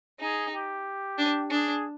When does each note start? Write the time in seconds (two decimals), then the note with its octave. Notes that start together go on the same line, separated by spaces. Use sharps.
0.20 D#4 G#4
0.53 G4
1.18 D4
1.51 D4 G#4